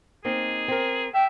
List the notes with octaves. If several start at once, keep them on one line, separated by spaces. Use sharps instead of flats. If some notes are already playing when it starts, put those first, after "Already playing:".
A#3 C4 D#4 G#4
C4 A#4
E5 G5